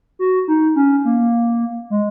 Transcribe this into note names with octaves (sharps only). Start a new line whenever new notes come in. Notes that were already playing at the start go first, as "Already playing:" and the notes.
F#4
D#4
C#4
A#3
G#3